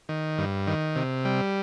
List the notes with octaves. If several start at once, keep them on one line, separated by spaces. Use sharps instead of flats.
D#3
G2
D#3
C3
G3